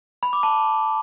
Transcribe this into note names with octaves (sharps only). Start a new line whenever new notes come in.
B5
D6
A5